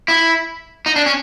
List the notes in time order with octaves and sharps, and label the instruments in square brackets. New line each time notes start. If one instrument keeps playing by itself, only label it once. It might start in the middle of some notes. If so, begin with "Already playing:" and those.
[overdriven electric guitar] E4
D#4
D4
C#4